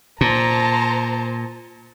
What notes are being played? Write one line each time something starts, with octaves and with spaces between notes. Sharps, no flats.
A#2 C5 A5 A#5